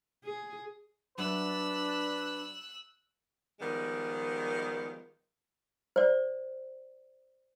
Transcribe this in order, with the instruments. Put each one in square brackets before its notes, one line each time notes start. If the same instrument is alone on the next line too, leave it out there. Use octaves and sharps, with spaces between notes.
[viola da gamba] G#4
[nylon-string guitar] F#3 E5 [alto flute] D4 [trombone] B4 [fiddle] E6 F#6
[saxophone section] D#3 F3 G3 G#3 B3
[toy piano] C5 D5